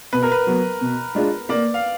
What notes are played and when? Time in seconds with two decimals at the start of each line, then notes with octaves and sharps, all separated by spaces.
0.13 B2 B4
0.23 A#4
0.32 B4
0.47 F#3 B3
0.81 B2
1.15 G#3 D4 F4
1.49 A#3 D5
1.74 F5